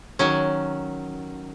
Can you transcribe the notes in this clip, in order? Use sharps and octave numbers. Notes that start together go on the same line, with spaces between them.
D#3 F#3 C#4